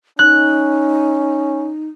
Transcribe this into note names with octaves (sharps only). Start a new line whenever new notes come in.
C#4 D#4 F#6